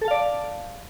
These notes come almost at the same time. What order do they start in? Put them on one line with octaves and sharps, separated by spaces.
A4 A5 F5 D5